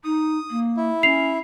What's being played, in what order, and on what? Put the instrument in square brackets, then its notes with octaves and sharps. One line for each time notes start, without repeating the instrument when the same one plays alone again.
[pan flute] D#4 [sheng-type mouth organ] D#6
[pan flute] A#3
[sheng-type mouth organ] E4
[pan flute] C#4 [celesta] C7 F7